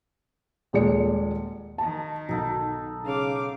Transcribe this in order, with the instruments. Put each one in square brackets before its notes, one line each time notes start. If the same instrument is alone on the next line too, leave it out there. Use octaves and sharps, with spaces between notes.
[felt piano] D#1 A#2 G#3 D5 C#7
[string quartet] D#3 [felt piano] A5
[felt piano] B1 [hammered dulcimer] D#4 A4 F#5
[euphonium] C#3 [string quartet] F5 D6